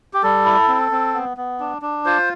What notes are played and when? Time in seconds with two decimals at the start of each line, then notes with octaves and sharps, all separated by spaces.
0.13 G4
0.23 G3 A4
0.45 E4
0.68 C4
0.92 C4
1.14 B3
1.37 B3
1.60 D4
1.82 D4
2.05 F4 C5